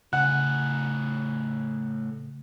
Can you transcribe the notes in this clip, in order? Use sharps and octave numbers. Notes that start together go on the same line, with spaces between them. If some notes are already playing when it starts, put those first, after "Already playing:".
A2 C#3 G#4 F#5 F#6